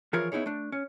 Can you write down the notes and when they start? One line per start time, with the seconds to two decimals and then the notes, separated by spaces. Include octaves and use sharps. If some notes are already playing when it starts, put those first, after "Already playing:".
0.13 E3 F3 F4 G#4 A#4 C#5
0.32 B3 D#4 E4 G#4 C#5
0.46 A3 D4
0.72 C#4